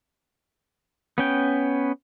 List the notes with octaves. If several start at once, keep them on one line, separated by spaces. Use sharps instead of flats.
B3 C#4 G5